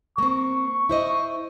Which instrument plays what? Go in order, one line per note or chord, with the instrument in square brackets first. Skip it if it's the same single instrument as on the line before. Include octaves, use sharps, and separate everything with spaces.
[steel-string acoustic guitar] A#3 C4 [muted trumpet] C#6
[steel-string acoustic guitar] E4 C5 D#5